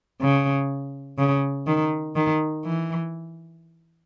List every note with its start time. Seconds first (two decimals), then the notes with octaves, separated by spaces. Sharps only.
0.21 C#3
1.18 C#3
1.67 D#3
2.16 D#3
2.65 E3